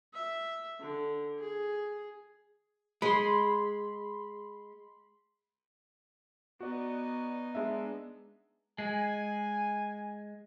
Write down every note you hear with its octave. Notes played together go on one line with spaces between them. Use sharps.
E5
D3
G#4
G#3 B5 C6
B3 D#4 F#4 D5
G#3 D4 E5
G#3 G#5